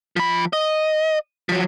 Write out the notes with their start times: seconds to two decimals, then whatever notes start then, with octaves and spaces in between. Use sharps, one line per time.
0.16 F3 B5
0.53 D#5
1.49 F3 F#3